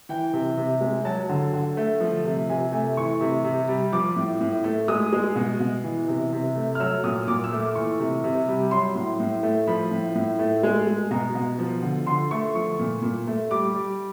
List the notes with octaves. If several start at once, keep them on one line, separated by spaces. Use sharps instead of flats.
E3 G5
C3
C3
G#3
F#3 A5
D3
D3
A3
F3
C3
C3 G#5
A3 G#5
E3 C#6
C3
C3
G3
F3 D6
A2
A2
A3
G#3 D#6
G#3
B2
B2
E3
C3
C3
A3
F6
F#3 E6
A#2 D#6
A#2 D6
E6
A3
D6
E3 C#6
C3
C3
G3
F#3 C6
A2
A2
A3
F3 B5
A2
A2
A3
G#3
G#3
B2 A#5
B2
F3
D3
D3 C6
A3 C#6
F3 C#6
A#2
A#2
A3
G3 D6
G3